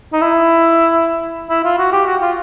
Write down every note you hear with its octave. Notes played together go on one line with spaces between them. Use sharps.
D#4
E4
E4
F4
F#4
G4
F#4
F4